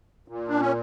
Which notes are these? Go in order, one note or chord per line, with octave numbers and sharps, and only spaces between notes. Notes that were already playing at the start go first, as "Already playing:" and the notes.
A#2
D4
C#4